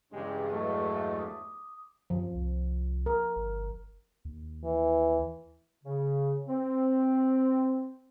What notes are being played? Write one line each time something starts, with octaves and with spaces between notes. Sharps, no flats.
E2 G2 C#3 G#3 G4
F#3 G#3 A3 D#5
D6 D#6
F#2 F3
C2
A#4
G1
D#2
E3
C#3
C4